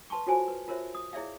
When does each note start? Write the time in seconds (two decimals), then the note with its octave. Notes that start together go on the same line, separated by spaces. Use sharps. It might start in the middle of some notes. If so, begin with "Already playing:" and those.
0.10 B4 A5 C6 C#6
0.27 F4 F#4 A4 C5 C#5 G#5
0.48 B4
0.68 F4 A#4 C5 C#5 E5
0.95 D#6
1.13 E4 G#4 C#5 D5 E5 F5